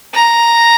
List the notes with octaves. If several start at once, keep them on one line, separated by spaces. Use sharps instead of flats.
A#5